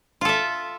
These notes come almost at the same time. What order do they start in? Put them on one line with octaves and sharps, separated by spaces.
F4 A4 E5